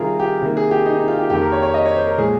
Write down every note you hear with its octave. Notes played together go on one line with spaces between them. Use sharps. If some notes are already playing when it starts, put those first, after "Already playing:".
Already playing: C3 D#3 G3 F4 G#4 A#4
G4
C3 D#3 A#3
G#4
G4
D#4
D#4
F4
G4
F2 D#3 A#3 G4
A#4
C#5
C#5
D#5
C#5
C5
A#4
A#2 F3 G#3 G#4